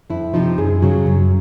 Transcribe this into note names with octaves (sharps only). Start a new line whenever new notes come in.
F2 E4
C3 F3 D#4
F#2 G#4
C#3 F#3
F#2